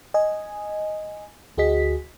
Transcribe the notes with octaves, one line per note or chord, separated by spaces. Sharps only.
D#5 G#5
D2 F#4 G#4 D#5 B6